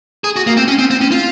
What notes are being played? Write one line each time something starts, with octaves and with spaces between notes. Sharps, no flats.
G#4
F#4
A#3
C4
C#4
C4
C4
C#4
F4